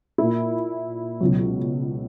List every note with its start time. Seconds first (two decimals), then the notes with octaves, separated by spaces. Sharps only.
0.18 A#2 A#3 E4
1.21 C#2 B2 F#3